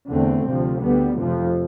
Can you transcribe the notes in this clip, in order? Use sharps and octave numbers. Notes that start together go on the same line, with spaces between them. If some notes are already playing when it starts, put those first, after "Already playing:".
E2 D3 A3 C4
D2 C3 F3
D2 D3 G3 B3
F1 F2 C3 F3